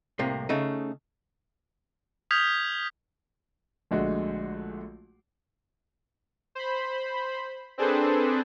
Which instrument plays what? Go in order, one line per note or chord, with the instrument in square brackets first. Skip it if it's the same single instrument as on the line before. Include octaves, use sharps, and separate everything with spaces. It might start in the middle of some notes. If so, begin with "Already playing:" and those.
[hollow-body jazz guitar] C2 A2 C3 A#3
C#3 A3 D#4
[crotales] D#6 F6 G6 G#6 B6 F7
[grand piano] A#1 D3 G#3 A3 F#4
[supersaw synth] C5 B5
C4 D4 G#4 A4 B4 C5